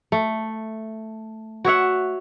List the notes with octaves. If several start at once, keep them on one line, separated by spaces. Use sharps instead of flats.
A3
F#4 C#5 E5 F#5